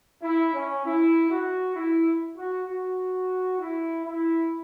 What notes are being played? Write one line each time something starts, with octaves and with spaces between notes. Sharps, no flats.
E4
C#4
E4
F#4
E4
F#4
F#4
E4
E4